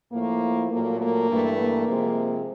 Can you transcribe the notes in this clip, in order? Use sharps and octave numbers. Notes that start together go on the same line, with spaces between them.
A2 F3 A3 A#3
A#2 F#3 A3 A#3
A#3
G2 E3 A3
A#3
C3 F3 G#3